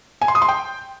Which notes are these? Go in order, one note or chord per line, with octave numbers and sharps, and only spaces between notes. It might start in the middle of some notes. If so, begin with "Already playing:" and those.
G#5
C6
D#6
C6
G5